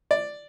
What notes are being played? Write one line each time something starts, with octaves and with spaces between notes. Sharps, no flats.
D5